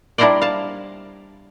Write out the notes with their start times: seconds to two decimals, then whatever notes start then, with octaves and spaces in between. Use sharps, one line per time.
0.18 G3 D4 E4 A#4 C5 D5
0.41 F5 A5